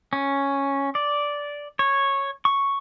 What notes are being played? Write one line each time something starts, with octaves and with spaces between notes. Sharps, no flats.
C#4
D5
C#5
C#6